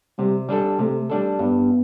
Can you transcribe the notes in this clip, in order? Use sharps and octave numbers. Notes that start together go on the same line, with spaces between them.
C3 G3
G3 D4 A4
C3 A3
G3 D4 A4
G2 B3